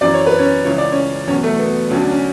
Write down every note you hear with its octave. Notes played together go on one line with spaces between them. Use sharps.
F#2 E3 D5
C#5
B4
C#4 C#5
C#2 C#3 E3 C#5
D5
C#4 C#5
E2 B2 F#3 C#4 C#5
A3 A4
B3
D2 D3 F#3 C#4
D4
C#4